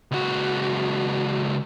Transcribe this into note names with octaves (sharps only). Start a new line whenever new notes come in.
C#2 F#4